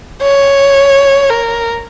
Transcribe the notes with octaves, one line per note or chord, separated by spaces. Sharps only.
C#5
A#4